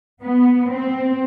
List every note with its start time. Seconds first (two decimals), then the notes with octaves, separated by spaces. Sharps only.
0.22 B3
0.71 C4